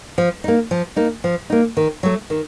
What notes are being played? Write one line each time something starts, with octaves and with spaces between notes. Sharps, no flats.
F3
A#3 D#4
F3
A#3 D#4
F3
A#3 D#4
D#3
F#3 A3
D#3